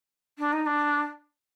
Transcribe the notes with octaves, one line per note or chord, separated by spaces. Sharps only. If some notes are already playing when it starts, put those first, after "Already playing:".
D4
D#4
D4